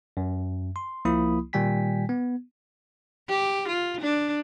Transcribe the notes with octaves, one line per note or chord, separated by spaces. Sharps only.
F#2
C6
C2 F3 A#3 E4 B5 D#6
A#2 D#3 G3 G5 G#5 B6
B3
G4
F4
D4